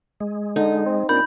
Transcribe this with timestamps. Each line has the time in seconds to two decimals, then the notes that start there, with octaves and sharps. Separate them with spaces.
0.20 G#3
0.56 D3 D#4
0.86 C4
1.09 A#2 C4 D4 B5 G6